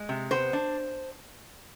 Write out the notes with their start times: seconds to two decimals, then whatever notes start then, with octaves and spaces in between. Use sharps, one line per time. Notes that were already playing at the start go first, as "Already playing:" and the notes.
Already playing: G#3
0.09 C3
0.31 B3 C5
0.53 D4